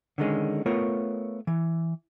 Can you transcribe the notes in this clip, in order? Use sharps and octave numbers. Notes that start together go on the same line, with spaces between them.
D3 D#3 G#3 C#4
A3 B3 F4 A#4 C#5
E3